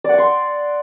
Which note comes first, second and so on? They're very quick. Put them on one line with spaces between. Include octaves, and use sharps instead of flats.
D5 F#5 C#6 C6